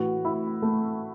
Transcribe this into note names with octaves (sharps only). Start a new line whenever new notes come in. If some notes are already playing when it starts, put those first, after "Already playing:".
Already playing: A2 E3 F#4
E4
A3